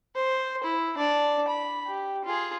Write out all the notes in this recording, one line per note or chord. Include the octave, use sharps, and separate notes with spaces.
C5
E4
D4 D5
B5
G4
F4 G#4